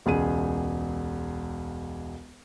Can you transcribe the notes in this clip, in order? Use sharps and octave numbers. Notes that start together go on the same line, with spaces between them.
E1 C#2 G#4 D#7